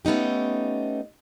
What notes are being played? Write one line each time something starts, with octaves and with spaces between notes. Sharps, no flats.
A3 B3 C#4 D#4 G4